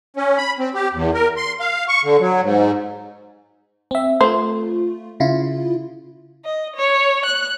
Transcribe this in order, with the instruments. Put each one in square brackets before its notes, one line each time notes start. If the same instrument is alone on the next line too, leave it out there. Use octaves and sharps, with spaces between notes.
[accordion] C#4
B5
C4
G4
E2
A#4
C6
F5
C#6
D3
F#3
G#2
[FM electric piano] C4 E5
[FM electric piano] A3 F4 [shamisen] C5
[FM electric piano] C#3 E4 F4
[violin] D#5
C#5
F#6